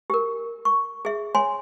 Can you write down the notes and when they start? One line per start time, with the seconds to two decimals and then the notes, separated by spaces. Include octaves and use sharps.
0.10 G4 A#4
0.65 C#6
1.05 G#4 E5
1.35 C#5 G#5 C6